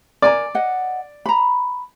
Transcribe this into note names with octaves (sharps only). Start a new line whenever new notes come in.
A#4 D5 G#5 A#5
D#5 F#5
A#5 B5